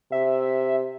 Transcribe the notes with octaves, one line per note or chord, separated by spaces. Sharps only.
C3 E5